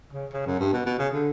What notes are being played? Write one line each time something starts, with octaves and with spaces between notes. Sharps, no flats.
C#3
C#3
F#2
G2
B2
B2
C#3
D3